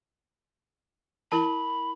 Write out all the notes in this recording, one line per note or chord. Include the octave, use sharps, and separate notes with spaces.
E4 A#4 A5 B5